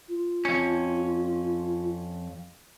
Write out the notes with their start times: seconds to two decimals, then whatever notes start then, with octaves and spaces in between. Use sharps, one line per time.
0.09 F4
0.45 F2 C#4